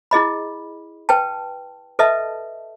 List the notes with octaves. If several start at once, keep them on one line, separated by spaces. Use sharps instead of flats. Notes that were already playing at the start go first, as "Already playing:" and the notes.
E4 G#4 D#5 B5
B4 G5 A5
A4 B4 D#5 E5 A5